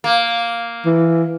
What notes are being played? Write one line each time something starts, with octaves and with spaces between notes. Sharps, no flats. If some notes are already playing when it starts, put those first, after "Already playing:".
A#3
E3